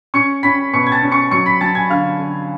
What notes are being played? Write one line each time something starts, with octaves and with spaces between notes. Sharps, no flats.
C#4 C#6 C#7
C#4 B5 B6
B2 C#6 C#7
G#6
A5 A6
C#4
C#6 C#7
F#3 C#6 C#7
B5 B6
F#3 A5 A6
G#5 G#6
D3 F5 F6
D3